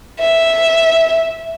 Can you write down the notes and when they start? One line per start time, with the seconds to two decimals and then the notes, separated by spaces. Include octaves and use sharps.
0.20 E5